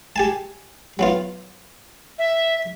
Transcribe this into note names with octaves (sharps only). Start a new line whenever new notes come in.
G4 G#5 A5
F#3 B3 F4
E5